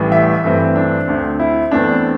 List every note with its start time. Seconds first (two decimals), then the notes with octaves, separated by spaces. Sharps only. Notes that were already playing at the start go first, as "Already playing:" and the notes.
Already playing: A1 A2 E3 G3
0.12 E5
0.44 G2 E3 A3 C4
0.76 D4
1.08 D2 D3 C4
1.40 E4
1.72 E2 E3 A3 C4 D4